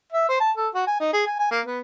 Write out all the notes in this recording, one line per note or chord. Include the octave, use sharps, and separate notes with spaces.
E5
C5
A5
A4
F#4
G#5
D#4
G#4
G#5
G#5
A#3
B3